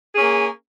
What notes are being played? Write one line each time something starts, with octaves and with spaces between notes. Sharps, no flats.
A#3 C#4 G#4